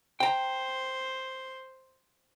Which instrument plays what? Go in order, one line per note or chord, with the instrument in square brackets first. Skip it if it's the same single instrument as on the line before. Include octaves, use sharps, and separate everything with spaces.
[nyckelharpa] C5 [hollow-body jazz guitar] G5 A#5